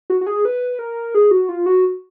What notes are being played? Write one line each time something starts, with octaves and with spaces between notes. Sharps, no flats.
F#4
F#4
G#4
B4
A#4
G#4
F#4
F4
F#4